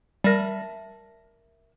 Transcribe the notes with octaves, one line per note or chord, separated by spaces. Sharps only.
G3 A#4 E5 A5 A#6